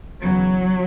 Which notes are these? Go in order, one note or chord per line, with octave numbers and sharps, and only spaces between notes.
E2 C#3 E3 F#3